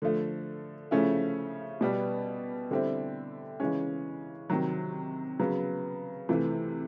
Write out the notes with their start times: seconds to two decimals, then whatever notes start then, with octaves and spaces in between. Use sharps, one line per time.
0.02 D3 F3 A3
0.91 C#3 F3 A3 C#4 E4
1.81 B2 G3 B3
2.71 D3 G3 C4 E4
3.60 C#3 E3 G#3 C#4
4.50 C3 D#3 F#3
5.39 C#3 F#3 B3
6.29 C3 E3 A3